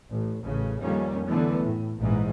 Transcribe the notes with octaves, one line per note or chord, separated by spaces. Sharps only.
A1
A1 C#3
F2 D#3 G3 A#3 C#4
D3 E3 A3 B3
A2
A#1 G#2 E3